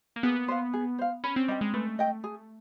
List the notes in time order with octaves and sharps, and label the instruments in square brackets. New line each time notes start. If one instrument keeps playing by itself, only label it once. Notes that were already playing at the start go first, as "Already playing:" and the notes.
[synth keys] A#3
[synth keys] B3 [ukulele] G#4
[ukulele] C5 F5
G#4
C5 F5
[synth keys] C#4 [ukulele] B4
[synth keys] C4
[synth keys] G3 [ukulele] D#5 G5
[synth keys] G#3
[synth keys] A3 [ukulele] B4
[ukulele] D#5 G5
G#4